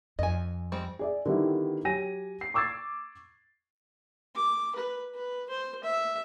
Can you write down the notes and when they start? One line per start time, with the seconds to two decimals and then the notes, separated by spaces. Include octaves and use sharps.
0.19 F2 D#5 G#5
0.72 G3 G#3 C4
0.99 G#4 D5 E5
1.26 D3 D#3 G3 B3 E4
1.85 F#3 G4 G#5 A#6 D#7
2.41 C7
2.54 C#6 D6 E6 G#6 A6 C7
4.35 D6
4.76 B4
5.15 B4
5.50 C5
5.84 E5